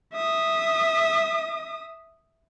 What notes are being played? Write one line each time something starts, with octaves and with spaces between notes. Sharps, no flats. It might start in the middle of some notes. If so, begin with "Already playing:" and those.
E5 D#6